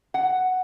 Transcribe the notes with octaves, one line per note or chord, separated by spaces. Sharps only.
F#5